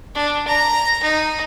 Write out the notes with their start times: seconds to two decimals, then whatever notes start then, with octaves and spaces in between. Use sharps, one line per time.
0.15 D4
0.48 A#5
1.03 D#4